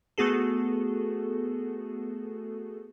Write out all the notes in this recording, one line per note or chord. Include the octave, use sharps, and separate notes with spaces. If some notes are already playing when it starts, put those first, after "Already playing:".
A3 B3 F#4 G#4 A4